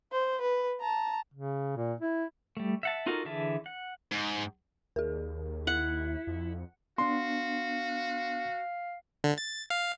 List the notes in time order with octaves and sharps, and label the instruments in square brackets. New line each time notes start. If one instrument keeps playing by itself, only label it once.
[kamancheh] C5
B4
A5 A#5
[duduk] C#3
A#2
E4
[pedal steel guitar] G3 A3
E5 F#5 A5
D#4 F4 F#4 A4 A#4
D3 E3 G#4 E5 A5
F#5
[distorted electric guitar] G#2
[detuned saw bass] D#2 [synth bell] G#4 A#4
[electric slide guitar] E4 [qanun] F#5 [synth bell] C#7
[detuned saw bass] F2
[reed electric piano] B3 D4 [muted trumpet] F#4 [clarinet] F5 [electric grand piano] C6
[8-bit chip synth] D3
A6
F5